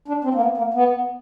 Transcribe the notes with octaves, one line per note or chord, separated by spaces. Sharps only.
D4
C4
A#3
B3
A#3
B3